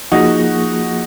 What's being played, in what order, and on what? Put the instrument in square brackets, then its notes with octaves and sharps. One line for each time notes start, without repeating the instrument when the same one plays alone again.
[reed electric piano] F3 A#3 F4 G#4 [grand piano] D#4 F#4